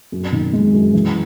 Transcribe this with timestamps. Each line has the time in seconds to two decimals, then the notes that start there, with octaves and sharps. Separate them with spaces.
0.12 F#2
0.32 D#3
0.53 G#3
0.74 F#2
0.93 E3